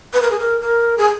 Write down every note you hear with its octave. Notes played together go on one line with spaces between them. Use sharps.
B4
A#4
G#4
A#4
A#4
G#4